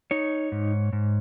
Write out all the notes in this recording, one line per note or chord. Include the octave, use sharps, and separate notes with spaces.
D#4 C#5
G#2
G#2